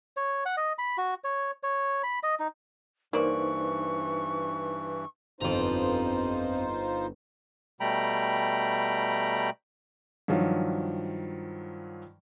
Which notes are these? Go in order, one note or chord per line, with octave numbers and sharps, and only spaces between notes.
C#5
F#5
D#5
B5
F#4
C#5
C#5
B5
D#5
D#4
G2 E3 A#3 D#4 C5 D5 C#6
G1 F2 B3 D#4 F4 C5 A#5
B2 G3 A3 G5 A#5 B5
G2 D#3 F3 F#3